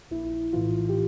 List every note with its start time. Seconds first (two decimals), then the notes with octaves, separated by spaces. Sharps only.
0.11 A#1 E4
0.53 A2 E3 F4
0.89 G4